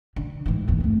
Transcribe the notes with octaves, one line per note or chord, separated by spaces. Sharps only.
D3
G#2 E3
G1 D#2
A3 C4